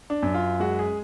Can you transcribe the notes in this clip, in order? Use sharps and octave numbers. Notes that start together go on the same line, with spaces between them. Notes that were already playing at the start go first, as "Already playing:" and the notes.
D4
F#2
F4
G#3 F#4
G#4